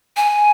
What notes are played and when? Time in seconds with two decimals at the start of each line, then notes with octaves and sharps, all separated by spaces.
0.16 G#5